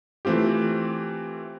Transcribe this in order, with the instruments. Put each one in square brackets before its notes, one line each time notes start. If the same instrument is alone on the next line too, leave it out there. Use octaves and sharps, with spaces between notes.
[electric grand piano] E3 A3 C4 F4 G4